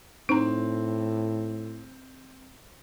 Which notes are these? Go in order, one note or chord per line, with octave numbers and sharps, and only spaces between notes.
A2 C4 D#4 A#5